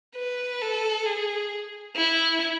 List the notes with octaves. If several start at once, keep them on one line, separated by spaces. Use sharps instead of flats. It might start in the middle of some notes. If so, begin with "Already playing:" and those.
B4
A4
G#4
E4